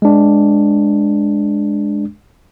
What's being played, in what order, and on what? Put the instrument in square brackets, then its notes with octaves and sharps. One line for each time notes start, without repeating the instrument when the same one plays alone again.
[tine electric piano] G#3 D4